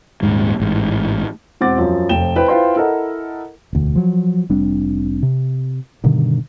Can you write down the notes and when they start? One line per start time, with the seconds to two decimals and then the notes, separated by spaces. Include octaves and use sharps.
0.22 D#1 G#2 G#3
0.60 A1 G#2
1.61 E1 C4 F#5 D6 A6
1.78 F#2 F3
2.09 F1 F3 G5 E7 G7
2.36 E4 B4 C5 G5
2.48 E4 F4 B4 C5 G5 C6
2.76 E4 A4 A#4 D#5 F#5
3.73 E1 D2
3.96 F3 F#3
4.49 F1 G3 C4 D4
5.23 C3
6.04 G2 B2 D3 D#3